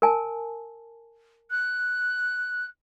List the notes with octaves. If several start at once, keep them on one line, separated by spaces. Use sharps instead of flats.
A#4 G#5 A5
F#6